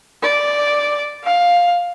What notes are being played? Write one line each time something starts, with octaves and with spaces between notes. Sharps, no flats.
D5
F5